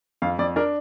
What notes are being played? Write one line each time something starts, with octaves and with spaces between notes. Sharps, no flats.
F2 F5
F2 D5
D4 A#4